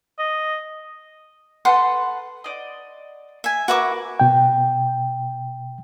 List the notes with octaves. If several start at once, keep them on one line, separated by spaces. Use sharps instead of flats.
D#5
A4 B4 F#5 C6
D5 D#5
E5 G#5
F#4 A#4 B4 E5 D6
B2 G5